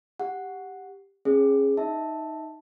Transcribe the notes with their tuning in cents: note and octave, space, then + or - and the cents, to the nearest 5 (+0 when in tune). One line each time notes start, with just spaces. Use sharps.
G4 +5 F#5 -5
C#4 -30 G#4 +0 C#5 +0
D#4 +0 E5 -20 A5 +0